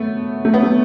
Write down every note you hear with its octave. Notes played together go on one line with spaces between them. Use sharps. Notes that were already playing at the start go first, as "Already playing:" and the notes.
Already playing: A3 B3
A3
B3
A3